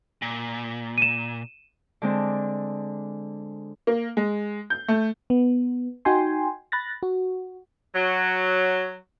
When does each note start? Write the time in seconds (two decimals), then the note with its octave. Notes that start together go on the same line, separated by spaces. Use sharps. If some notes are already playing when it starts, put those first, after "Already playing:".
0.22 A#2
0.98 D#7 E7
2.02 D3 G#3 C4 D4
3.87 A#3
4.17 G#3
4.70 G6
4.88 A3
5.30 B3
6.05 D#4 F#4 G5 G#5 C6
6.72 B5 F#6 A6 A#6
7.03 F#4
7.95 F#3